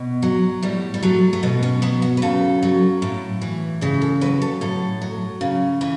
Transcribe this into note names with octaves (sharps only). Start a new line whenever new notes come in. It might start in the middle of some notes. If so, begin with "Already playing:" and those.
Already playing: B2
F#3
A2 G3
G3
F#3 A3
A3
B2 B3
C#4
F#3 B3
F#4
B4
C#3 A4
F#3
A2
E3
C#3 G4
A4
F#3 B4
A4
A2 A4
F#3
C#3
E3